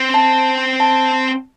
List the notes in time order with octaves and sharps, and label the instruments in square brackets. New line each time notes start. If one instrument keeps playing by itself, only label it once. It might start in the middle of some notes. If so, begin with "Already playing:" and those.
Already playing: [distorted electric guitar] C4
[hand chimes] A5
A5